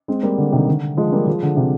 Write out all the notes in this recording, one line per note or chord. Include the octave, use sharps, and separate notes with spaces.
G#3 C4
G3 A#3
D3
C3 D#3
D3
F3 G#3
G3 A#3
F3 G#3
D3
C3